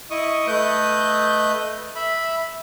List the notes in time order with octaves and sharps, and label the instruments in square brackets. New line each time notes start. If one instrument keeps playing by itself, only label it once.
[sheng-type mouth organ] E4 D#5 C#6 D#6
A3 B4 D#5 G6
E5 B5